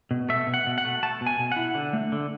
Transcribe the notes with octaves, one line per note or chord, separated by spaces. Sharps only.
B2
A3 E5
B2
F#5
B2
F#5
A3
A3 A5
B2
G#5
B2
E4 F#5
D3
A3
D3